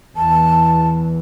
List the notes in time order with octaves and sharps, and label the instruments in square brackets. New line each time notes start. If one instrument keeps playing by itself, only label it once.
[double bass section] E2 E3 [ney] A5